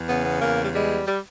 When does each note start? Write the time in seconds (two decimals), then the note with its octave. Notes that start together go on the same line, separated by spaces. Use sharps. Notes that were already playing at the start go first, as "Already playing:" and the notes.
Already playing: E2
0.09 C#3 B3
0.25 B3
0.42 E2 A#3
0.63 G3
0.73 G3 G#3
1.07 G3